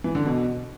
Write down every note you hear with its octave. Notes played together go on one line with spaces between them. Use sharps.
E3
D3
B2